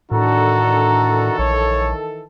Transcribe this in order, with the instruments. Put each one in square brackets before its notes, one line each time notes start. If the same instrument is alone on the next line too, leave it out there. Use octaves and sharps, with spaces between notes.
[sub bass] A2 [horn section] D#3 E3 A4 [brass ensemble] D4 A#5 [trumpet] F#4
[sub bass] A#1 [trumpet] C#5